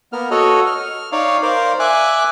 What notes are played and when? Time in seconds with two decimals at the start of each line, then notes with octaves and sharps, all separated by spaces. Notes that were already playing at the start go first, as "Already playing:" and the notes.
0.13 A#3 B3 F6
0.31 F#4 A4 C#5 D#5
0.66 F6
1.12 D#4 C#5 D5 F5
1.42 A#4 C5 D5 F5
1.80 E5 G#5 D6 F#6